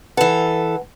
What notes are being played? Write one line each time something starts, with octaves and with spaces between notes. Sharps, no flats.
E3 A4 B4 F#5